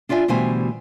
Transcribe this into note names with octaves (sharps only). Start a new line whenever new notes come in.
D4 F4 D5 E5 G#5
D2 B2 E3 G3 C5 G#5